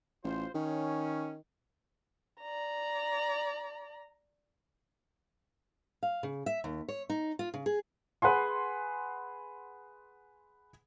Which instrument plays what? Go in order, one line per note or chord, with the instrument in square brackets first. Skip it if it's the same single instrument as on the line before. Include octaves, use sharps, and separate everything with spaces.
[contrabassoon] A1 [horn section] F4 C5
[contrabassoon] D#3 [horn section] C#4
[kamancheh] D5 A#5
[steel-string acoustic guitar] F5
C#3
E5
D#2
C#5
D#4
F4
C#3
G#4
[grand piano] G#4 B4 F#5 G#5 C6